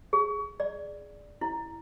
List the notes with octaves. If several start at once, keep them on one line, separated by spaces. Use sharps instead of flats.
G#4
D5
E4